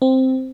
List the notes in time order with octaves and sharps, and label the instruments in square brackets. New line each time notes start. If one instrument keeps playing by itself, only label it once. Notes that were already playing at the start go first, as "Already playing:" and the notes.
[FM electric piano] C4